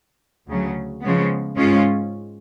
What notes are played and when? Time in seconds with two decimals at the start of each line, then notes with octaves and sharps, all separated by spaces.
0.48 D2 C#3 F#3
1.02 C#3 F3 G#3 B3
1.57 G#2 G#3 C#4 F4